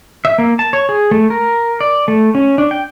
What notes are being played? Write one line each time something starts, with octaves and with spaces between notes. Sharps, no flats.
E5
A#3
A5
C#5
G#4
A3
A#4
D5
A3
C#4
D4
G5